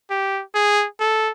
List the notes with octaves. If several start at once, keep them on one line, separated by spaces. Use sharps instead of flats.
G4
G#4
A4